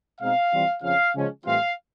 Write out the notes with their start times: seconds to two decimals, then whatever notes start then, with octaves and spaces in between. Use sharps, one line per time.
0.20 B2 G#3 C4 D#4 F5
0.52 E3 G3 C4 F4
0.82 F2 C#3 F3 F5
1.14 C#3 F3 G#3 C#4
1.45 A2 E3 G3 C4 F4 F5